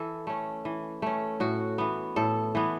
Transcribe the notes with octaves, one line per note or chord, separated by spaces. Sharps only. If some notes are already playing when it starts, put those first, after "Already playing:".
Already playing: E3 A4
A3 C#4
E3
A3 C#4
A2 F#4
E3 B3
A2 A4
E3 B3